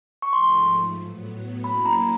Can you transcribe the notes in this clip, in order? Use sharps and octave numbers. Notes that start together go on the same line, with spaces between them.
C#6
G#2 F3 A3 C6
A2 F#3 B3
F#3 A#3 C#4 E4 B5
A#5